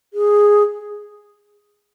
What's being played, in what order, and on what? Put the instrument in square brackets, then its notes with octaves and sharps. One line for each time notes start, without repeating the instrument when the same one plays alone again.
[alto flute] G#4